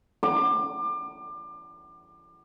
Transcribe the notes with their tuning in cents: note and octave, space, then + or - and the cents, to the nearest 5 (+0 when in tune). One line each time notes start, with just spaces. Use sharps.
D6 +30